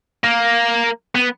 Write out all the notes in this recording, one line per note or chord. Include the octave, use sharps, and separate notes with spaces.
A#3
B3